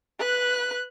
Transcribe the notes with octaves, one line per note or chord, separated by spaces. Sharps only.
B4 F#6